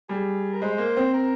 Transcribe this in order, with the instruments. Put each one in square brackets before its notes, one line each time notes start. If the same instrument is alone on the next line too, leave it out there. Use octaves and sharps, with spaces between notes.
[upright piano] G3 [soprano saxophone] G#4
[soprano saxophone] A#4
[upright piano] G#3 [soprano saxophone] C5
[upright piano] A#3
C4
[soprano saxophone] A#4